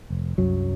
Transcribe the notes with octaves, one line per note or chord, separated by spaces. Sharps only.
F1
C2 F#2 F#3